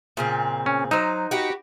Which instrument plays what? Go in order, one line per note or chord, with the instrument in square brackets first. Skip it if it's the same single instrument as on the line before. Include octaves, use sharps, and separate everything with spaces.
[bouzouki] A#2 C#3 C4
[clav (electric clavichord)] C#4
[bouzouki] F#3 C5 [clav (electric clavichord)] D#4
[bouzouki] F#4 G4 B4